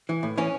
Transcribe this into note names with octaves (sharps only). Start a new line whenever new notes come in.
E3
A2
E3 C#4